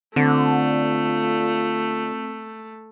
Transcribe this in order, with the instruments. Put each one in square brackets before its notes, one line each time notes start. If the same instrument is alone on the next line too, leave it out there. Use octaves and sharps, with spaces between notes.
[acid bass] D3 [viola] A3 [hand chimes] C4 [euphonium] F4